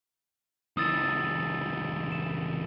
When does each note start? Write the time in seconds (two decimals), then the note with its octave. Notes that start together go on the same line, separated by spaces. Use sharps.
0.77 C#2 E3 D#6 E6 A6
2.12 E7